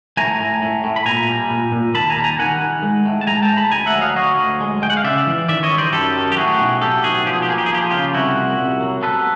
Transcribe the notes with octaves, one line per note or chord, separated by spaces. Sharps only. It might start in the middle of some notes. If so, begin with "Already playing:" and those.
A2 G#5 A#5
A2
A2
A2
B5
A#2 G#5 A#5
G3
A#2
A#2
D#2 A5 B5
G#5 A#5
G3 A5
G#5 A#5
D#3 F#5 G#5
D#3
G#3
A2
A5
G#3 G#5 A#5
G5 A5
A2
A5 B5
D2 G#5 A#5
E5 F#5
F#3
D#5 F5
F#3 C#5 D#5
D2
G#3
G#3 G5
F#5
F5
C#3 D5 E5
E3
D#3 D5 E5
C#5 D#5
G3
C5 D5
F#2 G4 A4
D#3
G4
A2 F#4 G#4
B1
A2 G4 A4
B1 F#4 G#4
F3 G4
G#4
G4
A#3 G#4
G4
G#4
F3 G4
G#4
C#3 F4 G4
C2 E4 F#4
A#2
C2
F#3
B3 A4 B4